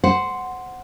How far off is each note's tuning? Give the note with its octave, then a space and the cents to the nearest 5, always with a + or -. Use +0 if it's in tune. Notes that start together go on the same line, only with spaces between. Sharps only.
C5 -5 F#5 +0